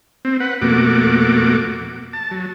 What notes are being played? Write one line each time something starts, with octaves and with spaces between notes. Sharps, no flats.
C4
B4 F#5
F2 B2 A3 A#3 F#4 D6
A5
F#3